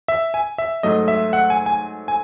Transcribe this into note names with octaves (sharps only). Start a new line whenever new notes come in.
E5
G#5
E5
G#2 F#3 A3 D#5
E5
F#5
G#5
G#5
G#5